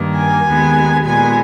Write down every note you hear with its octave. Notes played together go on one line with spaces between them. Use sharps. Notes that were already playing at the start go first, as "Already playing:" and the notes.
Already playing: G2 D#3 A#3
G#5
D#2 D#3 G#3 B3
A#2 G#3 B3 G#5